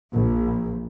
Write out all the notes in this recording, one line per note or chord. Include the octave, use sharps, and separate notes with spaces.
A#1